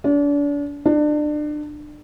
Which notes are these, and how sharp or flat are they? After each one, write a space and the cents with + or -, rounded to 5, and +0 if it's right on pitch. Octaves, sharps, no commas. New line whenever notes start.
D4 -35
D4 +30